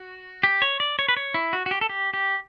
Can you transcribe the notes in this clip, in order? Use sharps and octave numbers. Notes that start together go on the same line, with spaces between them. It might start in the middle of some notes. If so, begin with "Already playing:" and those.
Already playing: F#4
G4
C#5
D5
C#5
B4
C#5
E4
F#4
F#4
G4
A4
G4
G4